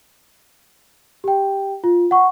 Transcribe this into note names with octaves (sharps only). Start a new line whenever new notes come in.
G4 G5
F4
F#5 C#6